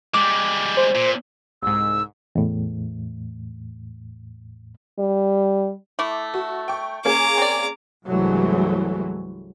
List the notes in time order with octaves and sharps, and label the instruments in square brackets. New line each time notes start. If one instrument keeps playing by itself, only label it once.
[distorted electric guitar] G3 G#3 [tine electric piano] D6
[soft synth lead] C5
[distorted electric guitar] A#2
[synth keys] C2 G#2 [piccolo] E6
[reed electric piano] E2 A2
[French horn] G3
[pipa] A3 E4 [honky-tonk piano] D6
[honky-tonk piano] F#4
G5 C#6
[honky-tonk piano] A#3 C#4 G#4 [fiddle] A#5 D6
[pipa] C4 D5
[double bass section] C2 G2 E3 F#3 G#3 A3